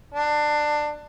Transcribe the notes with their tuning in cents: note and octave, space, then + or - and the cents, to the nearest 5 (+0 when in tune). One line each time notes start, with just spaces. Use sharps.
D4 +20